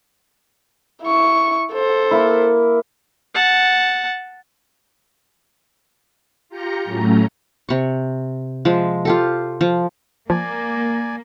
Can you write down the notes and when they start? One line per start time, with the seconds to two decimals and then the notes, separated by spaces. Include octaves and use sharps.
1.03 E4 C#6
1.72 A4 C5
2.11 A#3 E4
3.34 F#5 A5
6.49 F4 G4 A#5 G6 A#6 C#7
6.85 A2 F#3 A3 C#4 A#5
7.69 C3 C#6
8.65 F3 G#3 E5
9.05 F4 G4 A4
9.61 F3
10.30 F3 A#3 D5 G#5